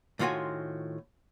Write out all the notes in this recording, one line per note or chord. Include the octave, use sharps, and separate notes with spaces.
A2 D#3 F4 F#4 C5 G#5